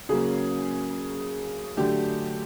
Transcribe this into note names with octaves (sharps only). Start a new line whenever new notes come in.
C#3 F#3 A#3 C#4 G#4
D3 F#3 A3 D4 G4